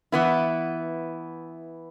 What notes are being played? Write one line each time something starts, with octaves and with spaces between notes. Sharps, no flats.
E3 B3 E4